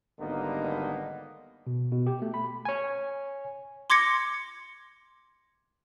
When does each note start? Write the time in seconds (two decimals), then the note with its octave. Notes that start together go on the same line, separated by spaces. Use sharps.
0.19 G#1 D3 G3 A#3 B3 D#4
1.67 B2
1.91 B2
2.07 G4
2.22 A3
2.34 B5
2.65 C#5 G#5
3.90 C6 D6 G#6 A#6 C#7